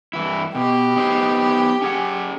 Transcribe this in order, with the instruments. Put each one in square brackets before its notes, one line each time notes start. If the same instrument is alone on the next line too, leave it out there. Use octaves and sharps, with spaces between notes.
[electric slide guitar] G2 E3 E4
[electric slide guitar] B2 [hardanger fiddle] G4
[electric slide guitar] B3 D#4 C5
C#4 G#4 F#5